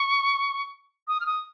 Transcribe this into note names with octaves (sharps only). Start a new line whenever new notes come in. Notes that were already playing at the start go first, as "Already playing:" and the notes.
Already playing: C#6
D#6
F6
D#6